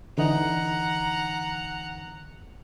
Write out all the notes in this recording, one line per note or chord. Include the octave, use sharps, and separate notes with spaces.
D3 E3 D#4 F#5 A#5